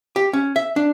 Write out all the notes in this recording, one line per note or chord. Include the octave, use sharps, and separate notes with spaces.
G4
C#4
E5
D4